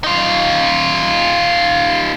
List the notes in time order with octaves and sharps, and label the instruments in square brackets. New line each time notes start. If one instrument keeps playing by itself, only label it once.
[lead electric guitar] D#4 F4